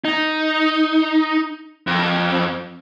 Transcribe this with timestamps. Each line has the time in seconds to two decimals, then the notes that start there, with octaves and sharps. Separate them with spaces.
0.05 D#4
1.87 F2